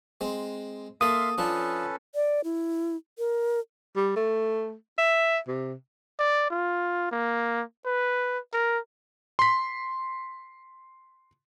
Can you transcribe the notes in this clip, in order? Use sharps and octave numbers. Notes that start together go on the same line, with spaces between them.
G#3 C4
A#3 A4 E5 F5 C6 D#6
F3 C#4 D4 A4 B4
D5
E4
A#4
G3
A3
E5
C3
D5
F4
A#3
B4
A#4
C6 B6